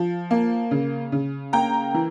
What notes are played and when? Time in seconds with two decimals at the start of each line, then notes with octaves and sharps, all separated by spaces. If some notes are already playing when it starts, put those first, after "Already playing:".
Already playing: F3
0.31 A#3
0.71 C#3
1.12 C#3
1.53 A#3 G5 A#5
1.94 E3